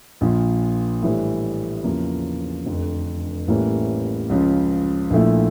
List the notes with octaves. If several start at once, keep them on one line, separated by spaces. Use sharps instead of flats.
A#1 A#2 F3
A2 E3 G3
E2 C#3 F3 A#3
F1 F2 D3
A1 A2 E3 G3 A#3
C#2 C#3 F3
A#1 A#2 F3 A3 E4